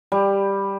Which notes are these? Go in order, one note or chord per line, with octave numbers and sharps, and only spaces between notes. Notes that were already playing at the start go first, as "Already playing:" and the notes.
G3